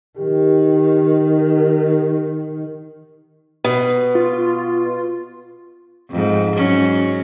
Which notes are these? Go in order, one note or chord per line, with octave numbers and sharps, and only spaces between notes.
D#3 G4
B2
F4
F2 G#2
G#2 F#3 C#4